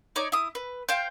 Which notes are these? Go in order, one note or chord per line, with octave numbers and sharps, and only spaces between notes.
D#4 C#5 D5
E4 D#6
B4
C5 F5 G5